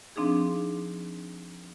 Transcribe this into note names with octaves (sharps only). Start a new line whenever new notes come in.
F3 C4 D4 D#4 G#4